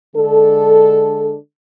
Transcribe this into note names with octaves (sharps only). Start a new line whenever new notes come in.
D3 G#3 D4 A4